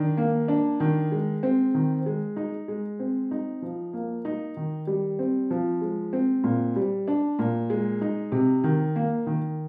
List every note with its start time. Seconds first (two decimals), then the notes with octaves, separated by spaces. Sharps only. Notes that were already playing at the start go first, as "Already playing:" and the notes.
Already playing: D#3 D4
0.17 A#3
0.48 D4
0.80 D#3
1.12 G#3
1.43 C4
1.74 D#3
2.06 G#3
2.36 D#4
2.68 G#3
3.00 C4
3.31 D#4
3.62 F3
3.93 A#3
4.25 D#4
4.57 D#3
4.87 G3
5.19 C4
5.51 F3
5.81 G#3
6.13 C4
6.44 A#2
6.76 G3
7.08 D4
7.39 A#2
7.70 G#3
8.01 D#4
8.32 C3
8.64 D#3
8.96 A#3
9.27 D#3